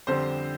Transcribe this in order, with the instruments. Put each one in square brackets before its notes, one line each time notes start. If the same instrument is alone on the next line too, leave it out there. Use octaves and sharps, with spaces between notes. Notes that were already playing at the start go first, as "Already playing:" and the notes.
[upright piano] F2 D3 G3 C4 C5